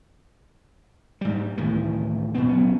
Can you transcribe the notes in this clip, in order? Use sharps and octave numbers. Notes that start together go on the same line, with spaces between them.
G#2 G3
C#2 A2 D#3 E3
A#2 B3 C4
C#2 F#3 B3 C#4